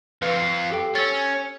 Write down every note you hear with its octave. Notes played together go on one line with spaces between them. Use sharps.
F2 F4 B4
G4 A4 G5
C#4 E6 A6